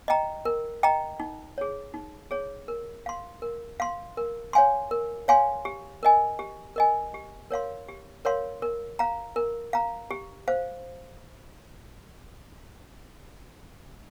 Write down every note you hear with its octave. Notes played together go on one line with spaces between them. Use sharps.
D#5 G5 A#5
A#4
D#5 G5 A#5
D#4
G#4 C#5
D#4
G#4 C#5
A#4
F5 C6
A#4
F5 C6
A#4
C#5 F5 G#5 C6
A#4
C#5 F5 G#5 C6
G4
A#4 D#5 G#5
G4
A#4 D#5 G#5
G4
A#4 C#5 F5 C6
G4
A#4 C#5 F5 C6
A#4
F5 A#5
A#4
F5 A#5
G4
C5 F5